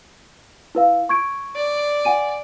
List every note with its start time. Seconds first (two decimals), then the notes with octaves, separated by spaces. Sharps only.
0.75 E4 B4 F5
1.09 C#6 G#6 D7
1.56 D5
2.05 F#5 G#5 D#7